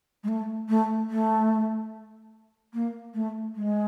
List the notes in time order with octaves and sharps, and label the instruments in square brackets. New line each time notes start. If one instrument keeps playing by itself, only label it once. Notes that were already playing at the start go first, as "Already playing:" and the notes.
[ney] G#3
A3
A3
A3
A#3
A3
G#3